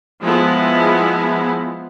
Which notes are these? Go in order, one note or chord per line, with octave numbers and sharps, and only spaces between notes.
F3 G#3 B3 E4